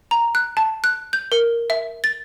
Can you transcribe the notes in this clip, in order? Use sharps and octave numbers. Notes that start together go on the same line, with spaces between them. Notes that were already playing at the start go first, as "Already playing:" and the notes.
A#5
F#6
A5
F#6
G6
A#4
E5
A6